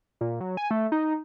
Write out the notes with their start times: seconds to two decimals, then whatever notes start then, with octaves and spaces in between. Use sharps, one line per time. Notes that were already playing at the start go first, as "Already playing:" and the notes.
0.21 A#2
0.40 F#3
0.57 G#5
0.71 A3
0.92 D#4